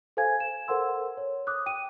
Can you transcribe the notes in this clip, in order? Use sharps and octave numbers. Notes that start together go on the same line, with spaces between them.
A4 C5 F5 G#5 G#6
E7
A4 A#4 C5 F#5 C6 E6
C#5
D6 D#6 F#6
G5 D#7